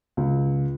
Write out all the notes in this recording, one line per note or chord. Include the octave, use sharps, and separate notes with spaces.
C#2